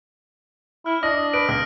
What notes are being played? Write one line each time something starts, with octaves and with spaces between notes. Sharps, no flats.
E4 F6
D4 D#5 D#6 A#6
B4 D7
C#2 D#6 F6 A#6